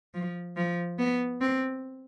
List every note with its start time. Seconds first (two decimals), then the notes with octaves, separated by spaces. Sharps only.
0.14 F3
0.57 F3
0.99 B3
1.41 C4